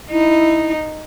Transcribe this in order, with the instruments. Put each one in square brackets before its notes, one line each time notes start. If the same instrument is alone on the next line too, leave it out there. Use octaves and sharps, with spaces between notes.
[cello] D#4 [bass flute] E4